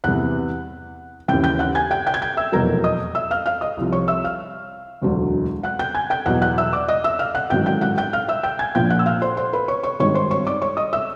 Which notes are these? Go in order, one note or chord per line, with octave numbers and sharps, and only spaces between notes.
E2 C3 E3 F#5 F#6
D#2 C#3 E3 G5 G6
G5 G6
F#5 F#6
G#5 G#6
G5 G6
G5 G6
G#6
G5 G6
E5 E6
F1 E2 B2 F#3 A#4 A#5
D#5 D#6
E5 E6
F5 F6
F5 F6
D#5 D#6
C2 C3 F3
C#5 C#6
E5 E6
F5 F6
E1 D2 D3 F#3
F#5 F#6
G5 G6
G#5 G#6
G5 G6
E2 B2 F#3 F#5 F#6
F#5 F#6
E5 E6
D5 D6
D#5 D#6
E5 E6
F5 F6
F#5 F#6
A1 G#2 D#3 F#3 G5 G6
G5 G6
F#5 F#6
G5 G6
F5 F6
E5 E6
G5 G6
G#5 G#6
A#1 A#2 F3 G5 G6
F#5 F#6
E6
F5 F6
C5 C6
C5 C6
B4 B5
C#5 C#6
C#5 C#6
G#1 G2 D#3 C#5 C#6
C5 C6
C#5 C#6
D5 D6
C#5 C#6
D#5 D#6
E5 E6